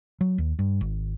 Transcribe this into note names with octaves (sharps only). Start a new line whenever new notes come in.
F#3
D#2
G2
G#1